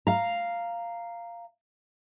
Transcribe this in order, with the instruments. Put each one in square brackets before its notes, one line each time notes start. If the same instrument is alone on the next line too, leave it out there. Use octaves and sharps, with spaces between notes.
[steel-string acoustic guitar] F5 A#5